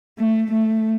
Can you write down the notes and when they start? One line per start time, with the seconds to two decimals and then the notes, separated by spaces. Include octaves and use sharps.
0.18 A3
0.52 A3